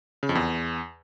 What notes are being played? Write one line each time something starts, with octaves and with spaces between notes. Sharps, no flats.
C#3
F2
E2